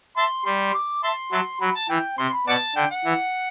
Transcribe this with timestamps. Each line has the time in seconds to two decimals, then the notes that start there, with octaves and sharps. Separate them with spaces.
0.17 E5 A5 C6
0.45 G3 C6
0.74 D6
1.04 E5 A5 C6
1.32 F#3 E5 A5 C6
1.60 F#3 B5
1.76 A5
1.89 E3 G5
2.18 C3 C6
2.33 B5
2.47 B2 D5 F#5 A5
2.76 D3 G5
2.91 F#5
3.05 E3